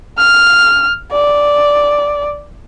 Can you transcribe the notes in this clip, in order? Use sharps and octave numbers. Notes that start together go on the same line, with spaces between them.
F6
D5